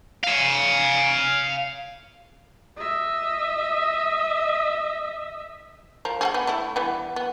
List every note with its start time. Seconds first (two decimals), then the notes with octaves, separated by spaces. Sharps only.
0.24 F5 G#5
2.76 D#5 E5
6.05 F3 A#4
6.21 G#4 A4 F#5
6.34 B3
6.47 A3 E4
6.76 E3 G3 B3
7.16 B3